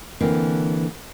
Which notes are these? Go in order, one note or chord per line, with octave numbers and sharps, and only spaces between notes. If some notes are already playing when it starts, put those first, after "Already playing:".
D3 E3 A#3 C4